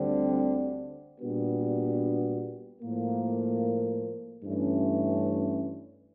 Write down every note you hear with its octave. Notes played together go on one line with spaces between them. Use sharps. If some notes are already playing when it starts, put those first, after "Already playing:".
Already playing: D2 D3 G3 C4
A#2 G3 B3 D4 F#4
A2 F3 A#3
G2 E3 A3 C#4